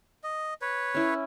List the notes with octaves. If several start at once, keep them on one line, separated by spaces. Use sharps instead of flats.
D#5
B4 C#5
C#4 E4